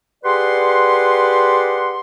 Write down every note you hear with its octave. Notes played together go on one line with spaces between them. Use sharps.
G4 G#4 B4 D5 F#5 C6